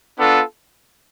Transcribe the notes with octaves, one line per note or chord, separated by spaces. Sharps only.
B3 D4 F4 A4